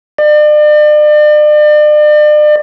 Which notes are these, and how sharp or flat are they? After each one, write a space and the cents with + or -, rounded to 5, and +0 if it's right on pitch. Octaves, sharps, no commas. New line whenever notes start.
D5 +40